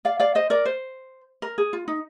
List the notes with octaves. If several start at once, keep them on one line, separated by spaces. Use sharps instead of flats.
D5 F5
D5 F5
C5 D#5
A#4 D5
C5
A#4
G#4
F4
D#4